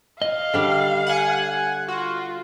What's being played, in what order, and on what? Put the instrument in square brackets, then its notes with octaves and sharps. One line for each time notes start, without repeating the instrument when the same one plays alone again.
[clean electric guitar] D#5 [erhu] F5
[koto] D3 G3
[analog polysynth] F#5 G#5
[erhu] F4 [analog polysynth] F#4